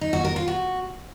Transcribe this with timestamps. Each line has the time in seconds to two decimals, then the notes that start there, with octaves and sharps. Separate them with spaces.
0.01 D#4
0.13 F#4
0.25 A#4
0.36 F4
0.48 F#4